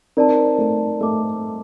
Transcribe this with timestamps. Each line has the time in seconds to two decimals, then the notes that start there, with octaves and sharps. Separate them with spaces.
0.17 C4 D#4 A#4 D5 A5
0.58 A3
1.01 A3 A#4 D#5 A5 D6